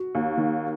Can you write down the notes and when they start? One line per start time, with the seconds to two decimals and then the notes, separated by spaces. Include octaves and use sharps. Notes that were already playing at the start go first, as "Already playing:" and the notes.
Already playing: F#4
0.15 D#2
0.37 D#3